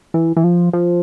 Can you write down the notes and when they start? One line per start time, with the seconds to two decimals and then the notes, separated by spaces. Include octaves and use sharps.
0.14 E3
0.37 E3
0.44 F3
0.73 F3